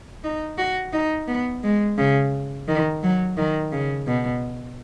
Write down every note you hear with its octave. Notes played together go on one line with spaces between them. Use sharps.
D#4
F#4
D#4
B3
G#3
C#3
D#3
F#3
D#3
C#3
B2